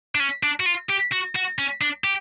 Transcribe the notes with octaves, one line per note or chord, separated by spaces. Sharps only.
D4
C#4
D4
F#4
F4
G4
F#4
F#4
C#4
D4
G4